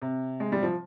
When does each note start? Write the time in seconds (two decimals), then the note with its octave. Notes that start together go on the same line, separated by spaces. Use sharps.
0.02 C3
0.40 G#3
0.52 G3
0.63 F3